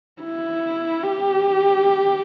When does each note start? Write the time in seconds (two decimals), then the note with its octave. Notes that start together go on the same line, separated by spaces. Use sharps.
0.22 E4
1.03 G4